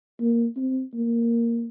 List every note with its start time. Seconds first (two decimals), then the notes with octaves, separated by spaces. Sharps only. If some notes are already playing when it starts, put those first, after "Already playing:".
0.20 A#3
0.56 C4
0.93 A#3